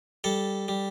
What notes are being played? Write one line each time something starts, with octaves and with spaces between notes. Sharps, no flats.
G3 A4
G3